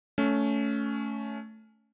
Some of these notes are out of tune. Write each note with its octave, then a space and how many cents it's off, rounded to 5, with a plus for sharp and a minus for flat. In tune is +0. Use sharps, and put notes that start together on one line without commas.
A3 +0 C#4 +15